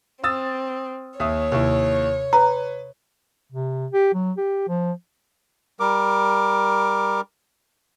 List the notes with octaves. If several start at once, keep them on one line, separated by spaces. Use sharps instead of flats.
C4 D#6 E6 A6
D#2 C#5 E5 D#6
D#2 C3 E4
B4 A#5
C3
G4
F#3
G4
F3
G3 A#4 D6